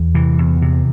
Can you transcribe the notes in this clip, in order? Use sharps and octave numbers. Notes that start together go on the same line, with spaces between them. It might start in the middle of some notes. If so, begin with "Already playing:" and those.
Already playing: E2
C3 E3
E2
C3